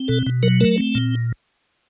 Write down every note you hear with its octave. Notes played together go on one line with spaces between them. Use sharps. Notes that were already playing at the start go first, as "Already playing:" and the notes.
Already playing: C4
B2 A4
B2
F#3 A#4
A3 A#4
C4
A#2